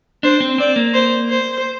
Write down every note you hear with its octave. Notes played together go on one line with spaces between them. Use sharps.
D4 C5
C4
C4 D5
A#3
C5
C5